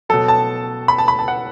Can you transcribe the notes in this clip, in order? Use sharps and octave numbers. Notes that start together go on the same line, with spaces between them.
B2 F#3 A4
A5
B5
A5
B5
A5
F#5